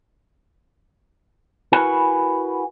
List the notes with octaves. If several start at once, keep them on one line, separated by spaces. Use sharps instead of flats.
E4 F#4 A#4 B4 F#5 G#5